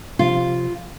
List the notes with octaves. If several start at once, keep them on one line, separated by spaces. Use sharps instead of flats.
C3 F3 F4